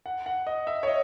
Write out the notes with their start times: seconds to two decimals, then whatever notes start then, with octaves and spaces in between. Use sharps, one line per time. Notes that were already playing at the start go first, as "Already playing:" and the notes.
0.06 F#5
0.26 F#5
0.47 D#5
0.67 E5
0.83 C#5
0.88 D#5